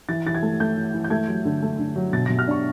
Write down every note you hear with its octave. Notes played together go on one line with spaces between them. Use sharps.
E3 A6
E3 A6
G#6
A3
A3 G6
E3
E3
G6
A3 G#6
F#3
D3
A3
D3
F#3
B2 A6
B2 A#6
F6
D4 C#6